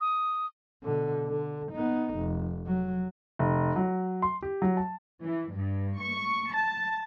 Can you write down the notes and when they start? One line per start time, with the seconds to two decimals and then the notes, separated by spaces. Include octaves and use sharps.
0.01 D#6
0.84 B2 D3
1.26 D3
1.72 B3 D#4
2.16 F1
2.66 F#3
3.39 F1
3.76 F#3
4.22 C6
4.42 G4
4.62 F#3
4.77 A5
5.23 E3
5.52 G2
6.00 C#6
6.53 A5